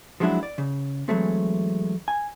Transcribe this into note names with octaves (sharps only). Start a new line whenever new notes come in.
F3 F#3 G#3 D4 E4 F#4
D5
C#3
E3 F#3 G#3 A3 C4
G#5